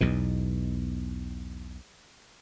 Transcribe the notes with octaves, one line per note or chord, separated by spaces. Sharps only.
B1 E2 B2